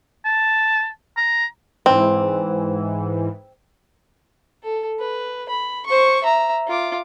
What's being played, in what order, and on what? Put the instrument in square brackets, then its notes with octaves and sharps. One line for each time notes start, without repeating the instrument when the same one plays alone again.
[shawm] A5
A#5
[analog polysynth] G#2 E3 [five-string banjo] C4
[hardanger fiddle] A4
B4
B5
C5 C#6
E5 A#5
F4 D6